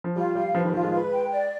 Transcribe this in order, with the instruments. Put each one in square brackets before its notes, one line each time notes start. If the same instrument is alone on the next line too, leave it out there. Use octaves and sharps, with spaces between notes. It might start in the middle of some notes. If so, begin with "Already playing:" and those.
[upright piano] F3
[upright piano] G3 [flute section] F4
[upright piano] G3 [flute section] F5
[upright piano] F3 [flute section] B4
[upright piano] D#3
[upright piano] F3 [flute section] F4
[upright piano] G#3
[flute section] B4
G5
D5